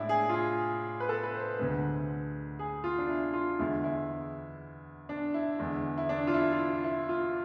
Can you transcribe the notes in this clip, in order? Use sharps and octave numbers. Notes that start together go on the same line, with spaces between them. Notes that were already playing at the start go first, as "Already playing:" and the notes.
Already playing: A2 G#3 D4 E4
G#4
F4
G#4
B4
A4
B4
C5
D2 D3 G#3 B4
G#4
F4
D4
E4
F4
E2 D3 G#3 E4
E4
D4
E4
E2 D3 G#3
E4
D4
F4
E4
F4
E4
E4
F4